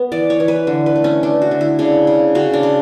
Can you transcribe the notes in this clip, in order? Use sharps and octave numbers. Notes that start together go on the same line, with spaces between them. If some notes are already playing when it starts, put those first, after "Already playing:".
Already playing: B3
E3 D5
C#5
E3
B4
D3
B4
A3
C#4
A3 D4
F#4
D3
E4
C#3 D4
C#3
C#3 F#4
D4
C#3